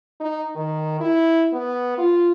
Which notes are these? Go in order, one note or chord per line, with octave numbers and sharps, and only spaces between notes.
D#4
D#3
E4
B3
F4